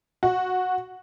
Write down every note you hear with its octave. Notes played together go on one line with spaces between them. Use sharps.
F#4